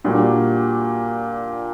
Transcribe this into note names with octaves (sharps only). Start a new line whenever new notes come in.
A#2 G3 D4 F#4